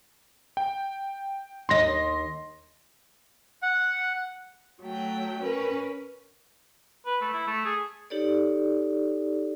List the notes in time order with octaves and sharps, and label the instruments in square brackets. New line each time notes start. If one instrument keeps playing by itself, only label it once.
[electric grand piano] G5
[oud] D#2 D#5 [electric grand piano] C6 A#6
[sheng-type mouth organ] F#5
[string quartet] F#3 A3 G5
C#4 A#4 B4
[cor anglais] B4
A3
E4
A3
G#4
[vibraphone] D#4 G4 A4 C#5 D5